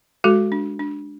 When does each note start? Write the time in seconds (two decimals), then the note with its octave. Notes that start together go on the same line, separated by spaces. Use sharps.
0.24 G#3 F#4 A4
0.52 D4
0.79 D4